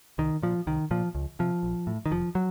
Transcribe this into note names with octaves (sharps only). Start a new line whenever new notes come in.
C2 D#3
A#2 F3
C2 D#3
A#2 F3
C#2
C3 F3
A#1
A2
D#3
F1 F3
F#3